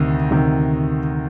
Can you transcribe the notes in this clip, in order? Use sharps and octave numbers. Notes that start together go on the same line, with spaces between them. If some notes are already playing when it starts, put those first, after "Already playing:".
Already playing: D2 C3 D#3
D2 C3 D#3